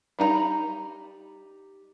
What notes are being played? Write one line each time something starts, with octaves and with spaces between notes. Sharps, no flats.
G3 D#4 G5 A#5 B5